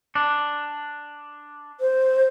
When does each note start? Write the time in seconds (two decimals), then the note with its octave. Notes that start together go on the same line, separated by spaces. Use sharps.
0.15 D4
1.80 C5